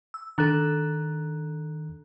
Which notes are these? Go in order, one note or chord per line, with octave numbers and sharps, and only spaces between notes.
E6
D#3 D4 A4 A#5 F#6